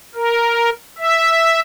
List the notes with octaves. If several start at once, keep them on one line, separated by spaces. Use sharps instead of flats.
A#4
E5